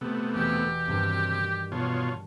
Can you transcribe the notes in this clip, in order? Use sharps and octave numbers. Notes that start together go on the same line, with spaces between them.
C3 A3 B3
E1 G4 E5
G2 C3 D#3
B2 F4 C#5 A5